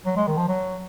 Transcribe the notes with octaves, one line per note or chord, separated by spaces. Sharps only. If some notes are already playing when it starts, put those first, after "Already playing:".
F#3
G#3
D#3
F3
F#3